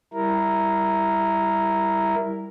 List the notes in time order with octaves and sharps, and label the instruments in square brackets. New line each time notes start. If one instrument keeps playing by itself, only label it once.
[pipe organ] G3 E4 A#4